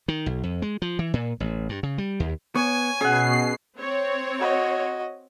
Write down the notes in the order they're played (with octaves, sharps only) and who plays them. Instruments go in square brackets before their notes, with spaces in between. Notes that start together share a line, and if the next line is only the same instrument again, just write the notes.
[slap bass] D#3
B1
F2
G#3
F3
E3
A#2
A1
G2
C#3
G3
D#2
[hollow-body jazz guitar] B3 [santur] C#5 [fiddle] G#5
[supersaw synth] B2 C7 [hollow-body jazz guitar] C#4 [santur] G#4 F#5
[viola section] C4 C#5
[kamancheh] F#4 D#5